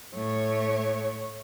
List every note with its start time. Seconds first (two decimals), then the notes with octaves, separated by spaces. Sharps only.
0.15 A2 C#5